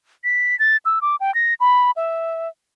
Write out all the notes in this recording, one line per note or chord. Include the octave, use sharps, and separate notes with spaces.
B6
A6
E6
D6
G5
A#6
B5
E5